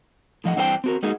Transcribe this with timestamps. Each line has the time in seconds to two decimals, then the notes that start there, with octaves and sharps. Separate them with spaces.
0.44 A2 F3 D#5 F#5
0.56 G2 E3 C4 D4 G#4 G5
0.84 C4 F#4 A#4
1.03 G#3 A#3 D#4 F#4 G#4